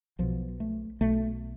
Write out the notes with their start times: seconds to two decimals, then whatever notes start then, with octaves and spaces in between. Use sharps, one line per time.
0.19 B1 B2 F3
0.60 A3
1.01 B1 B2 A3